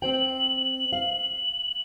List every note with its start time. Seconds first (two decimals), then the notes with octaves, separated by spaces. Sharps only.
0.02 C4 C5 G5 F#7
0.93 F5